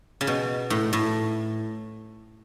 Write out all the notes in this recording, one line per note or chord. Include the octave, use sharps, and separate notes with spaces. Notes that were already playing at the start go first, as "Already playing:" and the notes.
C#3
B2
A2
A2